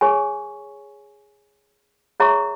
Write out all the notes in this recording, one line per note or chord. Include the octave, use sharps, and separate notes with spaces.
G#4 C#5 G#5 C#6
G#4 C#5 E5 A#5 C#6